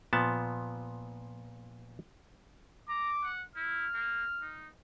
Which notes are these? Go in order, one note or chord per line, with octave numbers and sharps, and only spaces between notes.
A#2 F3 B3 A5
A#5 D6
F#5
E4 F6
A#3
D#4